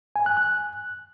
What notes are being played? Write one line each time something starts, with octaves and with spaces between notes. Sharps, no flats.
G#5
F#6
F#6